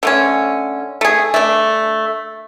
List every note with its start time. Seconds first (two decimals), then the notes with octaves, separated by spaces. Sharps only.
0.03 D3 A3 C#4
1.01 A3 G#4
1.34 A3 D4